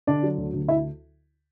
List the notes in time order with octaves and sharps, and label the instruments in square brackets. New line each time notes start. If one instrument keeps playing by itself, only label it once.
[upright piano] D3 D4 D5
F#3
D2
D2
E4 E5